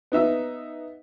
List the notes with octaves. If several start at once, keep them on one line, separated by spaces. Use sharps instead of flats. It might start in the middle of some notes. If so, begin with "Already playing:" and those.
B3 D#4 E5